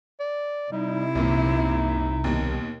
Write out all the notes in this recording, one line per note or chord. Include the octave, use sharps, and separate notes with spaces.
D5
C3 G3 D#4 E4
C2 F#2 A#2 E3 D#4
D#2 B2 D#3